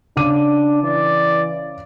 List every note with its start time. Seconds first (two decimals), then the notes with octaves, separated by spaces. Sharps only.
0.16 C#3 D4 D6 D#7
0.83 E3 D5